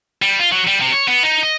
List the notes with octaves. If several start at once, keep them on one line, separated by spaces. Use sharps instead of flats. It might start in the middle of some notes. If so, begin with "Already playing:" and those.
G3
F4
F#3
G3
C3
C#5
B3
D#4
D#5